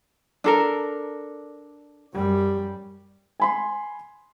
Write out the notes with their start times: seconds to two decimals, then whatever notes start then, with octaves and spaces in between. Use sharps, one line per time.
0.44 D4 A4 A#4
2.13 F#2 G3
3.40 G#5 B5 C6